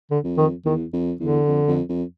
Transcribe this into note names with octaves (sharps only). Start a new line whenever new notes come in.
D3
F2
D#3
E2 D#3
F2
E2 D3
F2
F2
F2